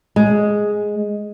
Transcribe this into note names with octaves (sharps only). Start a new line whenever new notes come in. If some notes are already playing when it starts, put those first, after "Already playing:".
G#3